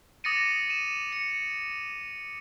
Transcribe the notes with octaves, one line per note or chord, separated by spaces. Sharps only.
D6 D#6 A6 A#6 C#7 D#7
D#7 E7
C#7